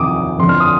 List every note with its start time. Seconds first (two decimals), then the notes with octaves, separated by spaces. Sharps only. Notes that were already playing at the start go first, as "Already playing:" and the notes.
Already playing: F2 C3 D#3 D6 D#6
0.38 F2 D3 C6
0.49 F6
0.60 D#6